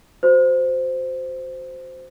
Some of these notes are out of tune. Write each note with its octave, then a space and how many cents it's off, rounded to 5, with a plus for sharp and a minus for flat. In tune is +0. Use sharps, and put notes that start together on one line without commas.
F#4 -5 C5 -10